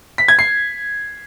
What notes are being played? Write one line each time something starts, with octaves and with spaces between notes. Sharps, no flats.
B6
G#6
C7